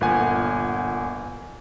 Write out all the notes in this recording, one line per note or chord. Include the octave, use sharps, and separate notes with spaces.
G1 A#2 F#5 G#5